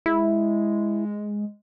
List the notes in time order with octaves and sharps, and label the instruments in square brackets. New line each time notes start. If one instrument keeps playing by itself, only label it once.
[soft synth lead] G#3 [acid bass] E4